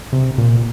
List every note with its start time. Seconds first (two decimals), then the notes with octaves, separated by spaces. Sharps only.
0.13 C3
0.38 A#2